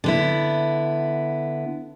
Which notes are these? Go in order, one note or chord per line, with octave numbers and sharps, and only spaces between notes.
D3 B3 E4